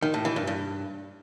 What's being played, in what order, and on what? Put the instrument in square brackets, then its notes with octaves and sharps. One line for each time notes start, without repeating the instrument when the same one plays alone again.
[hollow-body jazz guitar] D#3
A2
E3
G2
G2